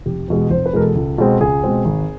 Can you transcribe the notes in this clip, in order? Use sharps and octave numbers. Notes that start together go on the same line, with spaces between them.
F1 G4
E2 B2 G#3
F1 C5
B4
E2 B2 G#3 A#4
A4
C#2
B2 G#3 C4
C#2 G#4
B2 G#3 C4
G#1